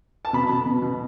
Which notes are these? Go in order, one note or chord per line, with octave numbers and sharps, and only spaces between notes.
A5
B2 B5
B2
B2
B2